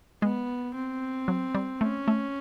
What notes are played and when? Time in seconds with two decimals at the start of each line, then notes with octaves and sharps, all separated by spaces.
0.22 G#3 B3
0.75 C4
1.28 F#3
1.55 G3
1.81 A3 C#4
2.08 A3